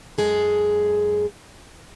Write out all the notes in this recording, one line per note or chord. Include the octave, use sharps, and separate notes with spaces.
F#2 G#3 G#4 A4